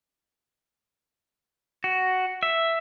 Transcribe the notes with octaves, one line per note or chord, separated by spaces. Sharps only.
F#4
E5